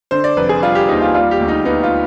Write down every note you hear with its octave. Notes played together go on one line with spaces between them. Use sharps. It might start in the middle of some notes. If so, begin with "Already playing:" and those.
D3 C5
D5
F1 B4
G#4
G3 F4
G4
D#2 D#4
F4
G3 F4
G4
D2
D#4
B3 D#4
F4